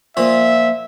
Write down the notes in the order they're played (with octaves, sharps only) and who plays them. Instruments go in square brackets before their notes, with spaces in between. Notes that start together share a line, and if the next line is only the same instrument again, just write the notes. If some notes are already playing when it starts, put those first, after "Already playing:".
[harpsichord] A#2 F3 [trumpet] E5